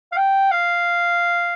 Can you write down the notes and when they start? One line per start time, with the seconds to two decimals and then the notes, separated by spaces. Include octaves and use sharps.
0.12 F5
0.17 G5
0.51 F5